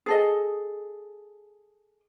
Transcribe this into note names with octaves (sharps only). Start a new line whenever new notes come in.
G#4 A4 D#5